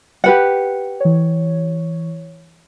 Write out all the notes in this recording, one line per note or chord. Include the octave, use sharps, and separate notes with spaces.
G4 B4 F#5
E3 C#5